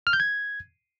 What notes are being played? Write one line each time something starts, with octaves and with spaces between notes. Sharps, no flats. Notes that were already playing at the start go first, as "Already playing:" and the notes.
F6
G6
G#6